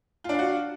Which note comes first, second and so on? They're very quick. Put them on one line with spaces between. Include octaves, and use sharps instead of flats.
F4 D4 F5 F#4